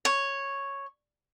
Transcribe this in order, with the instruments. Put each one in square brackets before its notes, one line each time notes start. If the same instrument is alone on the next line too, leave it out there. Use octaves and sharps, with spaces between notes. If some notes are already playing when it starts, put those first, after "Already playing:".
[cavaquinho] C#5